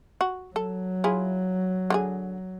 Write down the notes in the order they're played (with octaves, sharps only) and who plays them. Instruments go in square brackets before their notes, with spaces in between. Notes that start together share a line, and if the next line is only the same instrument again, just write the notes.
[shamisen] F#4
[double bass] F#3 [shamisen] A4
[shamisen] E4 F4 G#4
D3 C#4 G#4